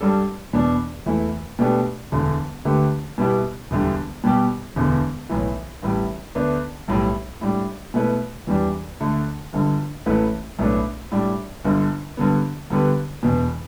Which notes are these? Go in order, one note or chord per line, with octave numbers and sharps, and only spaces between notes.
G2 G3 D4 A4
E2 B2 B3 D4
E2 E3 A3 E4
B2 A3 D4 G4 B4
E1 D2 D3
D2 D3 A3 G4 B4
B2 G3 B3 E4 G4
E1 D2 D3 G3
B2 G3 B3 G4
E1 D2 D3 B3
B1 A2 E3
A1 A2 G3
D2 D3 B3 D4 B4
B1 A2 G3
A2 G3 D4
B2 A3 E4 B4
E2 E3 G3 D4
D2 D3 A3
G1 G2 D3
A1 A2 A3 E4 B4
B1 A2 A3 D4 B4
A2 G3 D4
G1 G2 D3
G2 D3 B3
G2 D3 B3 G4 B4
E1 E2 B2